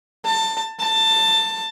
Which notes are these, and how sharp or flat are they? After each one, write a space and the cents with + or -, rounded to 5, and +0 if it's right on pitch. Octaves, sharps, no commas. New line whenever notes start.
A5 +20
A5 +20